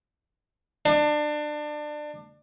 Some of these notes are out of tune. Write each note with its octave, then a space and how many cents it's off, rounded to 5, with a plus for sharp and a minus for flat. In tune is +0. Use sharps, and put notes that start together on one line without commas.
D4 +25